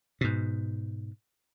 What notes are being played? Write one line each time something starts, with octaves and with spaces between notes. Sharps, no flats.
G#2 B2